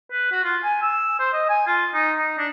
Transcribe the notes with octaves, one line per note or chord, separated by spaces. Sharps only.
B4
F#4
F4
G#5
E6
C5
D#5
G#5
F4
D#4
D#4
D4